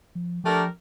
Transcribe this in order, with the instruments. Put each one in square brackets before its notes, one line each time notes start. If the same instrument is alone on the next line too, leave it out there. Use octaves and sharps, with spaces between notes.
[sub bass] F3
[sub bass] F3 [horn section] A3 D4 G4 A#4